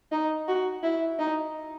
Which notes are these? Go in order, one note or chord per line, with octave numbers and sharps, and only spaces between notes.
D#4
F#4
E4
D#4